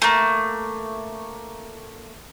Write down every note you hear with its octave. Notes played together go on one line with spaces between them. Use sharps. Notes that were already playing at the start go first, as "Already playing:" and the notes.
A3 A#3